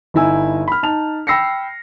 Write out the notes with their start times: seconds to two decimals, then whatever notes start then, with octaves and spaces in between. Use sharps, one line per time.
0.14 G1 D#4 E4 G#5 E6
0.68 B5 F6
0.83 D#4 A5 F7
1.27 G5 B5 E6 A#6 C7 C#7